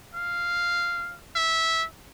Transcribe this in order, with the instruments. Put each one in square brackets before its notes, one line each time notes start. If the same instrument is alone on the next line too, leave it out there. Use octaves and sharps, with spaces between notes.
[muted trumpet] F5
E5